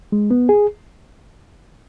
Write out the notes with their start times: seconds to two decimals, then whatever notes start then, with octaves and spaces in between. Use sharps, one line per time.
0.12 G#3
0.31 B3
0.49 G#4